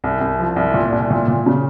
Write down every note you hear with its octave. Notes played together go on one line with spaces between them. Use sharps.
C2
C2
F3
C2
A#2
C2
A#2
A#2
C#3